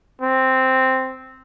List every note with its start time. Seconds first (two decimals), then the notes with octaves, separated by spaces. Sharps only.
0.22 C4